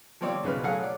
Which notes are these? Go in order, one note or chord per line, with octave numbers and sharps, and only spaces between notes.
F3 G3 C4 C#5 D5
B1 C#3 B4 F6
F#3 A3 G#4 F5 F#5
D5